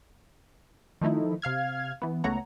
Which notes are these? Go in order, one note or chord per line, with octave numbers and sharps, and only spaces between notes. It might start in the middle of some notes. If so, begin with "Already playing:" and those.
D#3 F3 A3 D#4 E4
C3 F5 F6 G#6
E3 B3
C#2 A3 B3 C#5 F#5 A#5